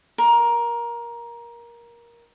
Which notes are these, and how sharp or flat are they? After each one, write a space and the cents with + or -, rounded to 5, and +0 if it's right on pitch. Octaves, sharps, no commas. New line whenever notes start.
A#4 +15